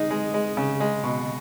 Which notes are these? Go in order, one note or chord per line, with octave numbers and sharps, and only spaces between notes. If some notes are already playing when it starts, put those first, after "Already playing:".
Already playing: G#3 D#4
G#3
G#3
C#3
G#3
B2